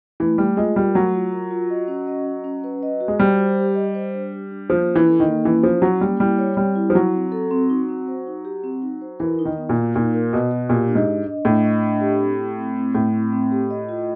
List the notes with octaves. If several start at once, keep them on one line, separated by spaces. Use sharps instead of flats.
E3 A3
G3 A3
G#3 F4
G3 A#4
F#3 A3
F4
A#4
F4
D#5
C#4
D#5
D#5
C#4
B4
D#5
F#4
G#3
G3 C5
C5
G4
D#5
C5
D4
G4
D4
F3 A#3
C#4
E3
A4
D#3
A#3
E3 C#4
F3 E4
F#3 C#4
G3 A#3
G3 E4
C#5
G3 C4
E4
F3
F#3 E4
C4
A4
C4
D#4
C4
C5
D#4
G4
C4
D#4
C5
E3 A#4
D#4
D#3
B3
A#2
F#4
A#2 D#4
A#4
B2 B3
F#4
A#2 G4
D4
G#2
D4
D#5
A2 D4
D#5
D4
G4
C4
E4
C4
C4
A2 E4
C4
C4
G4
D#5
F4